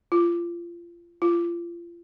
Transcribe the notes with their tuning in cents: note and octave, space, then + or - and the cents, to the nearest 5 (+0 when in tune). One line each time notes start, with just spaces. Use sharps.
F4 -25
F4 -30